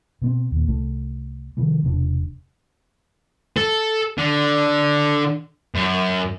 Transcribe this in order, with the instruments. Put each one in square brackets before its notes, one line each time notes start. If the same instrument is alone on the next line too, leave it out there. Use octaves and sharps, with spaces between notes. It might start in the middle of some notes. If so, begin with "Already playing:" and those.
[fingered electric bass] B2 B3 C4
D#2 A#2
C2 A3
C3 D#3 F3 G3
E1 C3 D4
[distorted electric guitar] A4
D3
F#2